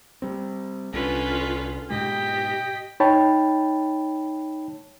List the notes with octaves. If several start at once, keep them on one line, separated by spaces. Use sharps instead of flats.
G3 C4
C2 D3 C#4 F4 B4
G#2 B2 G#3 G4 D#5 G5 B6
D#4 C#5 G5 A5 B5